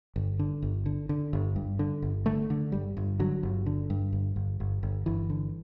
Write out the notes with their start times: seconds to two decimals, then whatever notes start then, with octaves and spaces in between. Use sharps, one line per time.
0.16 G1
0.39 D3
0.62 G1
0.86 D3
1.09 D3
1.33 G1
1.56 G2
1.79 D3
2.02 G1
2.26 D3 A3
2.50 D3
2.72 G1 G3
2.97 G1
3.19 D3 F#3
3.43 G1
3.66 D3
3.90 G2
4.13 G1
4.36 G1
4.60 G1
4.83 G1
5.06 G1 E3
5.30 D3